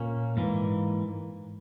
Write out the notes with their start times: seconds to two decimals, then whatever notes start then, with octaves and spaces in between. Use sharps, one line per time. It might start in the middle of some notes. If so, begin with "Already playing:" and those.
Already playing: A#2 A#3 C#4
0.37 G#2 E3 A#3